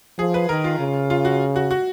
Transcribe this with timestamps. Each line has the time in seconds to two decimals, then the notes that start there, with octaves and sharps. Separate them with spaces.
0.18 F3 G#4
0.34 B4
0.49 D#3 A#4
0.64 F4
0.79 C#3
1.10 F4
1.25 F#4
1.56 F#4
1.71 F#4